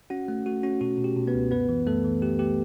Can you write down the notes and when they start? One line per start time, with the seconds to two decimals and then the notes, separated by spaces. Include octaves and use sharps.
0.10 C#4 F#4 F#5
0.28 A3
0.46 A3 F#4
0.63 C#4 F#4
0.81 B2 F#4
0.98 B2
1.04 G4
1.17 B2
1.28 B3 B4
1.34 C#2
1.51 F#2 B3 B4
1.69 E3
1.86 F#2 A3 A4
2.04 E3
2.22 A3 G4
2.39 A3 G4